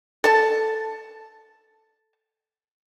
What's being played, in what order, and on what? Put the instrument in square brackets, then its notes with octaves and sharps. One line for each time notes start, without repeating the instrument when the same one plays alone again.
[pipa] A4 A5